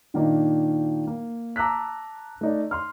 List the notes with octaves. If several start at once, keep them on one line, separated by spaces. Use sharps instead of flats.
A#2 D#3 A#3 D4 D#4
A#3
A5 A#5 D6 E6 F#6 B6
A3 D#4 D5
C6 F6